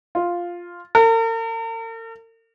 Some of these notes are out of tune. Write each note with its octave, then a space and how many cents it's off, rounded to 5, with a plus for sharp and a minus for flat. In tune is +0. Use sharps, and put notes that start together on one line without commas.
F4 +0
A#4 -45